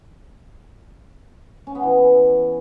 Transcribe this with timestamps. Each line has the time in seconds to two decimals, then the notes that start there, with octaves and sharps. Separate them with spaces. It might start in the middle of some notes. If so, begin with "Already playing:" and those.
1.67 C#4
1.75 B3
1.83 E3